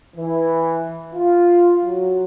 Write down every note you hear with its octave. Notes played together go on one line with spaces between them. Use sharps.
E3
F4
F#3